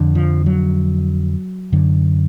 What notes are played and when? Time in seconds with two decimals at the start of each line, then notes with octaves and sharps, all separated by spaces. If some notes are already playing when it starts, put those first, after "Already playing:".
Already playing: F2 D3
0.15 F3
0.46 F#3
1.72 F#2 D3